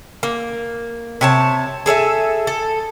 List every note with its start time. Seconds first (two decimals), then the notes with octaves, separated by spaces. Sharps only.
0.23 A#3
1.21 C3 C#5 A5
1.86 G#4 A4 D5 E5
2.47 A4